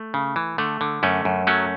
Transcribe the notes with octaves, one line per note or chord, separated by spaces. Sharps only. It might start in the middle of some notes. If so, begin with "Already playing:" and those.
Already playing: A3
C#3
E3
D3 A3
D3
F#2 A3 C#4
F#2
F#3 A3 C#4